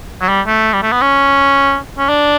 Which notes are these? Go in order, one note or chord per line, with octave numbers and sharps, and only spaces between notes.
F#3
G3
A3
G3
A3
B3
C#4
C#4
D4